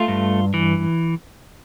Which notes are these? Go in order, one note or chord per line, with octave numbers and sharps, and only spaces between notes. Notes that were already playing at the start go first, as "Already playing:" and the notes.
Already playing: A3 F4
G2
E3